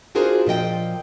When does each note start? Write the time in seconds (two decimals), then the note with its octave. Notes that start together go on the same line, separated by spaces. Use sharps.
0.15 D4 F4 F#4 G#4 A#4 C5
0.47 A#2 F3 D#5 G5